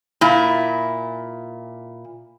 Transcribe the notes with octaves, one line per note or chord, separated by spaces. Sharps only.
A#2 E4